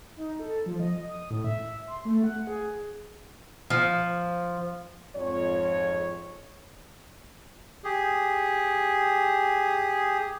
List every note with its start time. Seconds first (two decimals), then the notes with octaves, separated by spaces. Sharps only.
0.16 D#4
0.39 A4
0.66 F3
0.80 D#5
1.09 D#6
1.30 A2
1.44 E5
1.87 C6
2.05 A3
2.23 F#5
2.47 G#4
3.70 F3
5.16 F2 G#2 C#5
7.84 G4 G#4